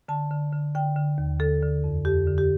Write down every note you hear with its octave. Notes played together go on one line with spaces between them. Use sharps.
D3 A5
D3
D3
D3 G5
D3
D#2
D3 A4
D3
F2
F2 G4
D3
G4